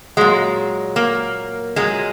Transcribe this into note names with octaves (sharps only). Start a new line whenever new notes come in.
A#2 F#3 G#3
A#3
A#2 F#3 G#3